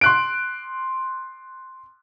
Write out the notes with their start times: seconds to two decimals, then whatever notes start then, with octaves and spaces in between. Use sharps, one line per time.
0.01 C6 F#6 D7